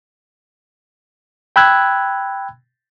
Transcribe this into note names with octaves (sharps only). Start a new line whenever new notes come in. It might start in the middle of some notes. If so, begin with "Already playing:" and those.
G5 B5 E6 F#6 G#6